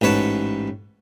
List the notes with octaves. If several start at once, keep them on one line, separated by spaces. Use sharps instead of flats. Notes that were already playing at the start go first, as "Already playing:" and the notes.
A1 G#2 B4 C#5 A5